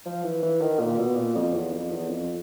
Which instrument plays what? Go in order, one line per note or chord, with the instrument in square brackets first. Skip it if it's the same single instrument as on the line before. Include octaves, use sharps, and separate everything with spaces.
[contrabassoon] F3
E3
E3
D#3
A#2
B2
A#2
F2
E2
F2
E2
F2